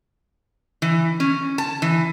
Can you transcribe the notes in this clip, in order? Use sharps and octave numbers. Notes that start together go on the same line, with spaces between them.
E3
C#4
A5
E3